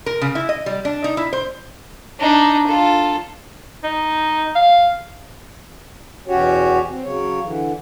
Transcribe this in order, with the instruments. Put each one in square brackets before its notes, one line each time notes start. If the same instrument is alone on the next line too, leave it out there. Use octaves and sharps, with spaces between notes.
[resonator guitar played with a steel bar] A#4
C#3
E4
D#5
G3
D4
D#4
E4
C5
[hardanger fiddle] D4 D#4
F4 A4
[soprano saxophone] D#4
F5
[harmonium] E2 B2 C#4 F#4 G4 C#5
C4
C#3 F#3 C#5
D3 E3